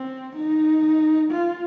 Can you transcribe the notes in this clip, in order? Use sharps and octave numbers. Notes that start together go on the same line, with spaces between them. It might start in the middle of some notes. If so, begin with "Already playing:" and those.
Already playing: C4
D#4
F4